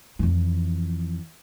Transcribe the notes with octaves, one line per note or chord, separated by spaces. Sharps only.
F2 E3